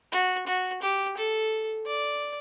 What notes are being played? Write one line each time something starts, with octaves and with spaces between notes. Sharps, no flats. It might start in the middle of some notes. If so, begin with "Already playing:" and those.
F#4
F#4
G4
A4
D5